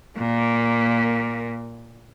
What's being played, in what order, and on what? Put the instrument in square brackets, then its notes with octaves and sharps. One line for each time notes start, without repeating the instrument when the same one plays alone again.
[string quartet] A#2 [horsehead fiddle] A#3